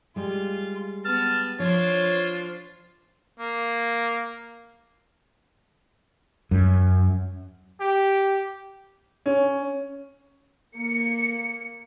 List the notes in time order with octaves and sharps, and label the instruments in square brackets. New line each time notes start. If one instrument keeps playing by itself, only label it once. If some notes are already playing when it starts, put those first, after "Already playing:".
[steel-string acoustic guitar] G3 G#3 [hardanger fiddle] F4
[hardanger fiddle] B3 [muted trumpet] A5 [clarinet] F6
[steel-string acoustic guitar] F3 [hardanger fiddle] D4 C5 [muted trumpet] F4 [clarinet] C#5
[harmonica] A#3
[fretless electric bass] F#2
[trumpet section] G4
[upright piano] C#4
[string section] A#3 C#7